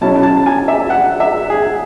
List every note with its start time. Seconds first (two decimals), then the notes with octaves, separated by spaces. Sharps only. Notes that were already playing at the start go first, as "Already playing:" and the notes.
0.01 B2 F#3 C#4 E4 A5
0.23 A5
0.46 G#5
0.68 E5
0.90 F#5
1.20 E5
1.50 G#4